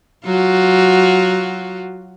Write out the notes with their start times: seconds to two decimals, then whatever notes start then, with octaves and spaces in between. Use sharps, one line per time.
0.25 F#3 F4 F#4